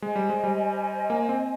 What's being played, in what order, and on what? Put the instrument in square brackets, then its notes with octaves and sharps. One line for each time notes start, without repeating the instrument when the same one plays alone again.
[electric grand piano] G#3 [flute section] C5 D#5 G#5
[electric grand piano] G3
G#3
G3
A#3
C4